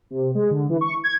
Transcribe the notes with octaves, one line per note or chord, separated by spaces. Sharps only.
C3
G#3
D3
E3
C#6
G#6